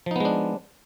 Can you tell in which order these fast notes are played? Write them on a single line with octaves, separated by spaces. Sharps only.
F3 D#4 B3 G#3 D4